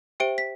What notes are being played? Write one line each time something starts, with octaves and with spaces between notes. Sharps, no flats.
G4 C5 E5 G5 D7
B6